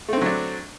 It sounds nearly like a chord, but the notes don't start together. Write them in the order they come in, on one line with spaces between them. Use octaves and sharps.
A3 C4 D3 F#3 D4